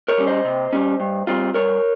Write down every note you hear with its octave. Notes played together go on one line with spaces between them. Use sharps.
A#4 C#5
G3 C#4
C5 D#5
C3
G3 C#4
G2
G3 C4 F4
G2 A#4 C#5